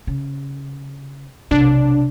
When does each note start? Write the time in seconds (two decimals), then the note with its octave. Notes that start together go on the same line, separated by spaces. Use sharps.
0.07 C#3
1.51 B1 C3 D4